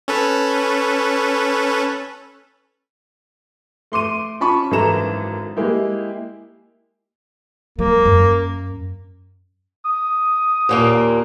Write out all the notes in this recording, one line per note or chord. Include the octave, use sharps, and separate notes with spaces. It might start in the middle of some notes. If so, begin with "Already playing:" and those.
C#4 A4 B4
A3 C6 D6 D#7
C#4 F4 A5 B5 C#6
G#1 F#2 E3 A4 A#5 E7
G#3 A#3 E4 G4
F#3 G#3 A#3
F#2
D#6
D#2 A#2 A#3